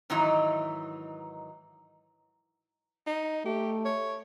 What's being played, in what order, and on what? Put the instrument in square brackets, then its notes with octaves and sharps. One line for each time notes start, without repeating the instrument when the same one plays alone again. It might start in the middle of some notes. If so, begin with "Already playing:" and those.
[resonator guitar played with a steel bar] G#2 D#3 E3 F#3 D#4 E4
[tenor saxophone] D#4
[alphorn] A3 [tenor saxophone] G4
[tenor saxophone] C#5